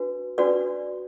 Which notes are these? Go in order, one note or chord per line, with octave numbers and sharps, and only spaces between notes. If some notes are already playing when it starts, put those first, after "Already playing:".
Already playing: D4 F#4 B4
D4 F#4 B4 D5